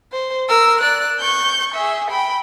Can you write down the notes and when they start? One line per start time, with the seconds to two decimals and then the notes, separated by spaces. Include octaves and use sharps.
0.12 C5
0.49 A#4 E6
0.81 D5 F#6
1.20 C#6 G6
1.74 G#4 E5
2.10 G5 B5